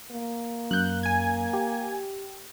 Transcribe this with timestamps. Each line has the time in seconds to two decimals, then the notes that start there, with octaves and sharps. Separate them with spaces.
0.11 A#3
0.71 F#2 F#6 G6
1.03 G#5 G#6
1.53 G4